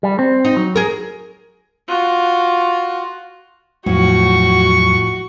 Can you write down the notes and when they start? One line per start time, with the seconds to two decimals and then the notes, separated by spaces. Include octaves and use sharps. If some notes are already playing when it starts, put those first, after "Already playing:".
0.03 G3
0.19 C4
0.45 D#4
0.56 F#3
0.76 G#4 A#4
1.88 F4 F#4
3.86 E2 A2 F3 F#3 F#4 C#6